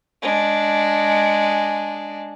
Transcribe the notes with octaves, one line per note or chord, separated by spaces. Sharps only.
G#3 D4